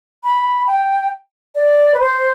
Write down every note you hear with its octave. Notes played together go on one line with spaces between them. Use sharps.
B5
G5
D5
B4
C5